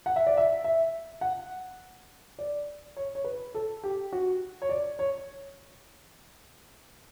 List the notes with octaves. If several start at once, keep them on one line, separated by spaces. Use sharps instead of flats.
F#5
E5
D5
E5
E5
F#5
D5
C#5
C#5
B4
A4
G4
F#4
C#5
D5
C#5